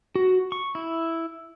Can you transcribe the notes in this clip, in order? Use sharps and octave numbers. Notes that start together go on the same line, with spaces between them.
F#4
C#6
E4